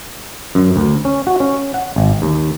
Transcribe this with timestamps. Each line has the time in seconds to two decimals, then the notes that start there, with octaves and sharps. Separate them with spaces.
0.55 F#2
0.76 D2
1.05 C#4
1.27 F#4
1.40 C#4
1.74 F#5
1.96 G#1
2.22 D#2